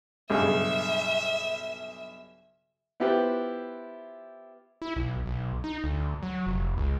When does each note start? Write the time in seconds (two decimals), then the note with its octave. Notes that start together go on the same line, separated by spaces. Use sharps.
0.30 B1 G2 C#3 E5
3.00 B3 E4 F4 G4 B4 C5
4.82 E4
4.96 B1
5.26 B1
5.64 D#4
5.84 D2
6.23 F#3
6.47 F1
6.77 C#2